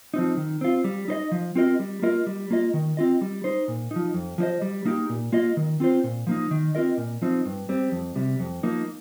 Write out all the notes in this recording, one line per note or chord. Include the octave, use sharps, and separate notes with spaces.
F3 C4 D#4
D#3
C4 F4
G3
D#4 C5 D#5
F3
C4 F4 A#4 D#5
G3
A#3 F4 A#4 D#5
G3
A#3 F4 D#5
D#3
C4 F4 D#5
G3
D#4 C5
A#2
D#4
F3
F2
F3 D#4 C5 D#5
G3
A#3 D#4 G4
A#2
A#3 F4 D#5
D#3
C4 F4 C5
A#2
F3 A#3 D#4
D#3
C4 F4 A#4 D#5
A#2
F3 C4 D#4
G2
G3 C4
F2
C3 G3
F2
F3 A#3 D#4